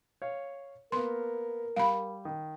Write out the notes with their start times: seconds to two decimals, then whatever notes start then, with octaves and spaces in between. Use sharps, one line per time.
0.22 C#5 F5
0.92 A#3 B3 A#4 C6
1.76 G3 F5 B5
2.25 D#3